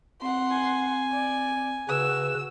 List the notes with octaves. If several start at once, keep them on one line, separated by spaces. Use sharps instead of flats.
C4 F#5 C6
G#5
D5
C#3 F#4 B4 E6